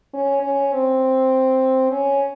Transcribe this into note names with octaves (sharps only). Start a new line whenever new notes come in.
C#4
C#4
C4
C#4